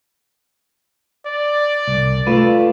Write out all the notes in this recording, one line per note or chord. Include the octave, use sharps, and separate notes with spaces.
D5
C2
A3 F4 B4